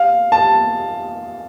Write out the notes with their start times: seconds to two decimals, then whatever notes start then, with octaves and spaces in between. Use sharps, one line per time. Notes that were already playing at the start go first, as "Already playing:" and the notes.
Already playing: F5
0.32 A5